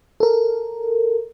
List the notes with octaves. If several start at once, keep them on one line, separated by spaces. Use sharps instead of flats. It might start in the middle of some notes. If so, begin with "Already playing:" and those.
A4 A#4